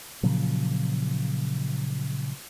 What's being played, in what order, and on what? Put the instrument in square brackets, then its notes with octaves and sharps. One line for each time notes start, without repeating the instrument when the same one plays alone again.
[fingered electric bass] A#2 C#3 F3 F#3